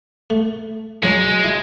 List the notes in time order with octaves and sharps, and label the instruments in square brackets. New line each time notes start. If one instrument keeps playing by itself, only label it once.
[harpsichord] A3
[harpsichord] C#2 C#4 A#5 [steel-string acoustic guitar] F#3 [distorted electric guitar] G#3
[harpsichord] E4